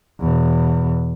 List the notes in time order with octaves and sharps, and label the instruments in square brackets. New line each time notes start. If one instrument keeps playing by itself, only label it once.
[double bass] E2 B2